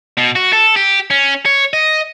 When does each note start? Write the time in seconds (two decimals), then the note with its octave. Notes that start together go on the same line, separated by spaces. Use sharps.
0.17 B2
0.35 F#4
0.53 A4
0.76 G4
1.10 C#4
1.45 C#5
1.73 D#5